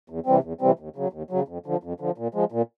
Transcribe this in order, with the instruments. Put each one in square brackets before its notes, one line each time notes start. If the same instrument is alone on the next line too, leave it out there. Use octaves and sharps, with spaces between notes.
[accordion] E2
C3 E3 G3 C4
E2
C3 E3 G3 C4
D#2
C#3 F#3
D#2
C#3 F#3
F2
D3 F3
F2
D3 F3
A#2
F3 G#3
A#2